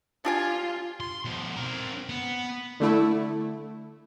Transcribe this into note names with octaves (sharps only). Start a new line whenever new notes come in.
D4 F4 G4 G#5
C6
B2 F3
C4 A#4
B3
D3 A3 E4